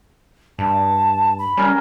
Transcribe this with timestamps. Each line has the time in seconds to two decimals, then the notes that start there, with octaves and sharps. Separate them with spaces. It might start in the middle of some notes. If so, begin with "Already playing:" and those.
0.59 G2 A5
1.39 B5
1.57 G3 C#4 A#4